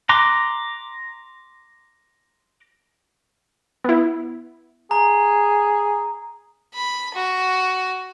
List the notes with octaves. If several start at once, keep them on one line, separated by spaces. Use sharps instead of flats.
A#5 C6 D6 F#6
B3 E4
G#4 A#5
B5
F#4